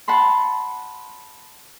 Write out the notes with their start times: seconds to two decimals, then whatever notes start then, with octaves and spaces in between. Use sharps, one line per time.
0.08 F#5 A5 B5 C6